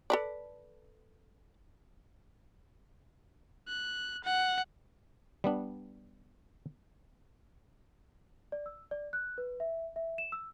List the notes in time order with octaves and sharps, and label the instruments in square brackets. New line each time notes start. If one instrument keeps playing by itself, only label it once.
[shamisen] A4 B4 D5
[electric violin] F#6
F#5
[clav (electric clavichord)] G3 B3 D4
[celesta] D5
E6
D5
F#6
B4
E5
E5
E7
E6